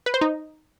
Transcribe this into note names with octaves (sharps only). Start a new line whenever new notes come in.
B4
C5
D#4